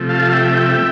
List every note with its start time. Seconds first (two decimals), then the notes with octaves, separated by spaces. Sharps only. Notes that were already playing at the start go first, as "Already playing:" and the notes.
Already playing: C3 F3 A3
0.09 F5 A5
0.32 E5 G5